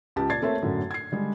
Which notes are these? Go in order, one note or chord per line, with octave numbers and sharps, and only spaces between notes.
C#2 G4 A5
A#2 D5 G#6 A6 C7
A3 A#3 C4 C#5 E5 A5
F#2 A2 D3
G#6 C7
D3 G3 G#3